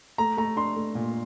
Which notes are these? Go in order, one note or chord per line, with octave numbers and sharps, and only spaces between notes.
A3 A#5
A3 A#5
D4 C6
A3
A#2